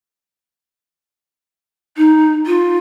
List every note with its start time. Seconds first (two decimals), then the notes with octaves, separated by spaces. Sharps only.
1.97 D#4
2.46 F4